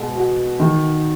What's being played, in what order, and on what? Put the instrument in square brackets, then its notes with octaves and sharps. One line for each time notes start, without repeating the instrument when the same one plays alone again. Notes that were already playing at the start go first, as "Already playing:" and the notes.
Already playing: [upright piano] B2 G#3 B3
F#4
D#3